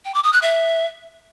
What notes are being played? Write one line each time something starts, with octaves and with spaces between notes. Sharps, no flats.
G5
D6
D#6
F#6
E5